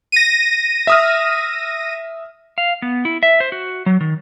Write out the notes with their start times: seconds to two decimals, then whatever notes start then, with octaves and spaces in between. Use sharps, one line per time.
0.12 A#6 D#7
0.87 E5 D#6 F6
2.58 F5
2.82 B3
3.05 E4
3.23 E5
3.40 C5
3.52 F#4
3.86 F#3
4.01 D#3